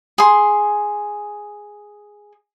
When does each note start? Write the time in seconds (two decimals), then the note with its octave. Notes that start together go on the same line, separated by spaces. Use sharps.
0.18 G#4 C6